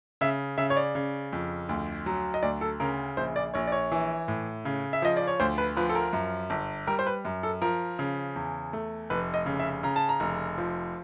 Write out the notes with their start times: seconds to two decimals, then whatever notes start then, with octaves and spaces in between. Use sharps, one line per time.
0.21 C#3 E5
0.58 C#3 E5
0.70 C#5
0.77 D5
0.95 C#3
1.33 F2
1.69 D2
2.06 F#3
2.34 D#5
2.43 D2 D5
2.61 A4
2.80 C#3 A#4
3.17 A#1 C5
3.36 D5
3.54 A#1 C#5
3.67 D5
3.72 C#5
3.92 E3
4.28 A2
4.65 C#3
4.93 E5
5.02 F3 D#5
5.17 D5
5.27 C#5
5.40 D2 C5
5.58 B4
5.77 F3 B4
5.89 A4
5.95 A#4
6.13 F#2
6.50 G1
6.87 G3 A#4
6.99 C5
7.07 B4
7.25 F#2
7.43 A4
7.62 F3 A#4
7.99 C#3
8.36 E2
8.73 A3
9.10 F1 B4
9.34 D#5
9.46 C#3
9.60 E5
9.83 C#3 A#5
9.96 A5
10.09 A#5
10.20 F1
10.58 F3